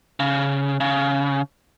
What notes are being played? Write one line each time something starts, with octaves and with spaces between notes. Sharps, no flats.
C#3
C#3